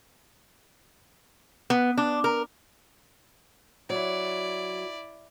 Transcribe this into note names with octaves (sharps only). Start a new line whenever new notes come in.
B3
D4
A#4
F#3 E4 D5